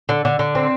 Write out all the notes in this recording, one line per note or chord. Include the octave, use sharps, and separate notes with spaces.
D3
D3
D3
C4